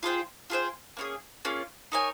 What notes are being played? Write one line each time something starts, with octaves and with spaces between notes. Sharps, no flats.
F4 G#4 C5 G5
F4 G#4 C5 G5
A#3 C#4 F4 G#4
A#3 C#4 F4 G#4
D#4 A#4 C#5 G#5